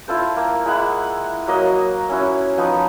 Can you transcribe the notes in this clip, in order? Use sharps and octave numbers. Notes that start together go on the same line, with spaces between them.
E4 F4 A4 C5
A#3
G#3 E4 F#5
F#3 A#3 D#5
C#4 E4 F#4
F3 B3 D#4 C#6